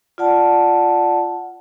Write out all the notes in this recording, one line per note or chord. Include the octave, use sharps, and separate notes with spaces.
F4 D5 F#5 A5